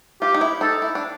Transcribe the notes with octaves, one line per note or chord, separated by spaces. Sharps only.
F4 G4
D#4
E4
D#4 A4
E4
D4